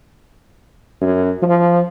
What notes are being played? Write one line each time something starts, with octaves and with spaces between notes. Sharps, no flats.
F#2
F3